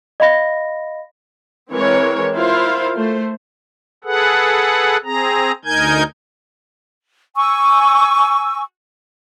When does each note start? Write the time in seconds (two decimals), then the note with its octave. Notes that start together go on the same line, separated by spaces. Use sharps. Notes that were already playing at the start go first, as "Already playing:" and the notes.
0.20 D#5 F5 B5 A#6
1.72 E3 G#3 C4 A#4 C#5
2.34 E4 F4 A#4 C5 F5
2.95 A3 C5
4.04 G#4 A4 B4 F#5
5.04 C4 G#4 A#5
5.65 D2 D#4 A#4 G#5 G6 G#6
7.36 G#5 C#6 E6